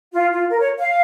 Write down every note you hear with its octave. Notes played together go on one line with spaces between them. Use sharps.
F4
F4
A#4
C#5
F5